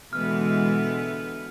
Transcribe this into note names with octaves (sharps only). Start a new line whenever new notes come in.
B2 D3 E3 G#3 B3 B4 E5 F6